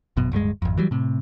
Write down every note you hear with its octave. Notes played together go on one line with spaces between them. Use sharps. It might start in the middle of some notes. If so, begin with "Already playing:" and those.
G#1 F#2 B2
D1 G2 G3 G#3
G#1 F2
E3 F#3 G3
A2 C3